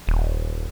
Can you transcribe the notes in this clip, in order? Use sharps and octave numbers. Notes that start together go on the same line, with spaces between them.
D#1